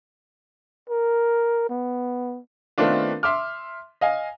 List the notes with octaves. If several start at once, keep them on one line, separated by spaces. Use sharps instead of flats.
A#4
B3
D#3 A3 B3 C4 D4 F4
E5 C6 D6 F6
D#5 F5 G#5